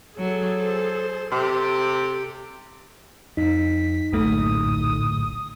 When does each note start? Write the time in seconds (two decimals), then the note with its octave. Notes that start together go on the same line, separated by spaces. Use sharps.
0.18 F#3 G#4 A4
0.59 C5
1.32 C3 G4 A4
3.37 F2 D#4 B6
4.12 D1 A#1 F#2 A#2 A3 D#6